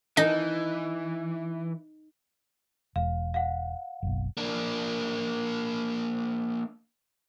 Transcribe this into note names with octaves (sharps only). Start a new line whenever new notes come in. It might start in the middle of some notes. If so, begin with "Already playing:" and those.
E3 D#4 D#5
E1 F5
F5 F#5
F#1 B1
A#3 D4